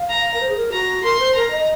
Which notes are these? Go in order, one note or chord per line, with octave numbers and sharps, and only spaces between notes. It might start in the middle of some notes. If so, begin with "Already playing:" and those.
Already playing: F5
A#5
A#4
C5
G#4
A#4
F#4 A#5
A#4 C6
C5
A#4 A#5
D#5